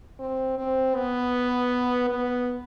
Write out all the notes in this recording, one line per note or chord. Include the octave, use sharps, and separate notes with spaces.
C4
C4
B3
B3